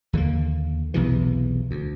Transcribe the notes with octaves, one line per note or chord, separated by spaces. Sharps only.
D#2 D3 A3 A#3
B1 E2 C3 E3
D2